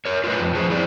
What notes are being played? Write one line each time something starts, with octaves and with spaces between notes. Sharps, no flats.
A#4 C#5
F4 G4 B4 D#5
F2
F3 G#4 C5
E4 C5 D5